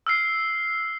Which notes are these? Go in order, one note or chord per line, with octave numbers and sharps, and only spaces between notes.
E6 F6 C7